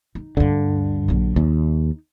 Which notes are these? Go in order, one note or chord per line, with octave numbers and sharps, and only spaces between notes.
D#4
D2 G2 D3
A#1 F#3
D#2 D#4